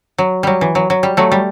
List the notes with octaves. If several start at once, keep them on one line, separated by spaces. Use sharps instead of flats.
F#3
F#3 G3
E3
F#3
F#3
G3
F#3 A3
G3